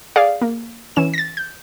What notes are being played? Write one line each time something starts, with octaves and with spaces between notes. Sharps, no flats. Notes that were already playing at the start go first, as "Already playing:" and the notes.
G#4 D5 F5
A#3
E3 C#4 E7
A6 A#6
G6